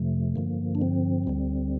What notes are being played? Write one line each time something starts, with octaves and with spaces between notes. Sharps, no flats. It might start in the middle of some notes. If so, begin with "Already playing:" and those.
Already playing: F2 C3 F3 A3
G2 D3 F3 A#3
D4
C4
D2 D3 G3